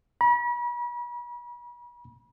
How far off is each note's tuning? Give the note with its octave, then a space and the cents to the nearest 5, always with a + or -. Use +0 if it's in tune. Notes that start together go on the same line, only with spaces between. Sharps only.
B5 -40